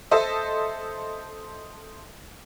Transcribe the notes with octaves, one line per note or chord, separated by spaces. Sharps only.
A4 C5 D#5 E5